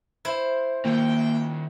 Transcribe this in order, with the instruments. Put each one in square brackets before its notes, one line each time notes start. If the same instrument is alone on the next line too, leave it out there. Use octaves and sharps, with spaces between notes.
[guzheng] E4 C5
[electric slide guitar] D#3 F4 [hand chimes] A#3 [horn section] G5